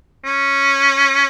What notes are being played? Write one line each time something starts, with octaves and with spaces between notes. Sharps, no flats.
C#4